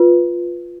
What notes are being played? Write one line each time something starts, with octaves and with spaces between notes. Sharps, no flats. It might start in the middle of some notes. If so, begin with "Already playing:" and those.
Already playing: F4 B4